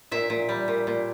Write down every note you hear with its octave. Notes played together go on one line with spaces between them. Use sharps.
A#2 E5
A#2
G3
A#2
A#2